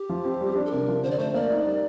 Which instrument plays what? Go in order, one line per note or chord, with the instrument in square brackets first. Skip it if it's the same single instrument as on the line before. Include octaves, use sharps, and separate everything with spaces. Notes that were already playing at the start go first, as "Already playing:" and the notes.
Already playing: [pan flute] G4
[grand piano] F3
C4
G3
D4
[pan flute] A4
[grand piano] C3 [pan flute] A#4
[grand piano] F3
[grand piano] D3 [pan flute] C5
[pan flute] D5
[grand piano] A3 [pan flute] C5
[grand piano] A#3 [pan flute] D5
[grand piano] D#4
G3